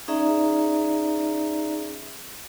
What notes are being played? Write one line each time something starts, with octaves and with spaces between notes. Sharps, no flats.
C#4 D#4 G#4 D5 E5 A#5